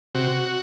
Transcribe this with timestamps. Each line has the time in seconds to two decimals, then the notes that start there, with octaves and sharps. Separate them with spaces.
0.15 C3 F#4